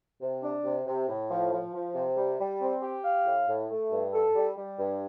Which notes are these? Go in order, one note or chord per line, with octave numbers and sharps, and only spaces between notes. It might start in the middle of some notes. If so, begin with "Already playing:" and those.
C3
D4
C3
C3
A2
F3
F3
F3
C3
G3
G3
C4
G4
F5
A2
A2
A3
G2
A4
G3
G3
G2